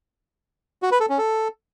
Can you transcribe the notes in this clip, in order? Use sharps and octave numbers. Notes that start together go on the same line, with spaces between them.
F#4
B4
A4
C#4
A4